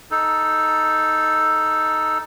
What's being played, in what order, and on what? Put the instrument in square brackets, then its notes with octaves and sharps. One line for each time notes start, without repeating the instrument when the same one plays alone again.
[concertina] D#4 A4